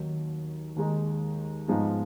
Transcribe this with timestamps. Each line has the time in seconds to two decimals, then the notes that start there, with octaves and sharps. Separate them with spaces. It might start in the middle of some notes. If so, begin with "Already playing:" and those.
Already playing: D#2 D#3 F#3
0.76 D#2 D#3 G#3 D#4
1.68 G#2 F3 G#3 B3 D#4